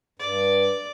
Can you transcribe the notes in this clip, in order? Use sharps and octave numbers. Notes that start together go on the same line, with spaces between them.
G2 D5